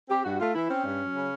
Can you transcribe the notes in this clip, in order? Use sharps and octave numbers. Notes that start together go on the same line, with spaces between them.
C4 G4
G2 F#4
A3 F4
E3 E4
C4 C#4
G2
F#3
C#3